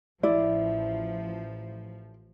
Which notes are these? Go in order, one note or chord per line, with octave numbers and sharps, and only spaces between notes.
A1 F3 E4 D5